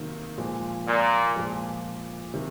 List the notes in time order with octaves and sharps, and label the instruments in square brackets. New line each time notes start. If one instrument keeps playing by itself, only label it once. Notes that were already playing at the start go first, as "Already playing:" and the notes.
Already playing: [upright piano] C3 D#3 F#3 A#3 D#4
A#2 F3 G#3
[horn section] A#2
[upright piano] A#2 F3 G#3
C3 D#3